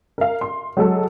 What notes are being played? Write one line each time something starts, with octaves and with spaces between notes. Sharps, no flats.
A#4 F5
C6
F#3 G#3 A4